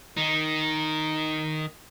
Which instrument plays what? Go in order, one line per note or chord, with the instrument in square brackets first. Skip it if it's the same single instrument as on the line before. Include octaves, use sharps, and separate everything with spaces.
[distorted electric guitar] D#3 D#4